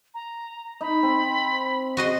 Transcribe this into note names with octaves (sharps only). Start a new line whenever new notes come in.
A#5
D#4 B5
C4
F#4 D#5 C6